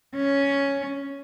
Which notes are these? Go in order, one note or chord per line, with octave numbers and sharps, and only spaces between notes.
C#4